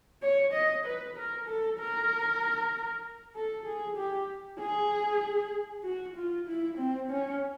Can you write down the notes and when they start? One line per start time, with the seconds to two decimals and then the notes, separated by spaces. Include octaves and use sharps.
0.22 C#5
0.53 D#5
0.85 B4
1.16 A#4
1.47 A4
1.79 A#4
3.35 A4
3.66 G#4
3.97 G4
4.60 G#4
5.84 F#4
6.16 F4
6.47 E4
6.78 C4
7.10 C#4